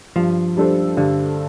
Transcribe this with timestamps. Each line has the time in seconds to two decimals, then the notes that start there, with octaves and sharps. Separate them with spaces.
0.16 G2 F3
0.57 G3 D4 A4 C5
0.97 G2 D3